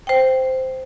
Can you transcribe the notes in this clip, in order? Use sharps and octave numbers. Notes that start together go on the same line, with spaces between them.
C5 G5